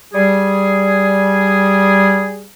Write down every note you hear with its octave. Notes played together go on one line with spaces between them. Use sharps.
G3 G#4